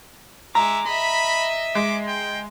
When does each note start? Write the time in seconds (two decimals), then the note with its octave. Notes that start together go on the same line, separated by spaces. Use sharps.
0.55 G#3 E5 A#5 D6
0.87 D#5 E5 B5
1.75 G#3 D6
2.08 G5